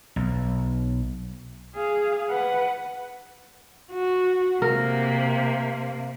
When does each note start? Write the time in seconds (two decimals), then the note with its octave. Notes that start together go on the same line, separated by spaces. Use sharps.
0.16 B1
1.75 G#4 F5
2.30 B4 F#5
3.92 F#4
4.62 C3 A#3 A#4